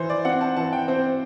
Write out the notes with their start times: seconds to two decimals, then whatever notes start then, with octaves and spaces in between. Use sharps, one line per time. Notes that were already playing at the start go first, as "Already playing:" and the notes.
Already playing: E3 C5
0.10 D5
0.25 C4 F#5
0.41 A5
0.56 E3 A5
0.73 G5
0.88 C4 C5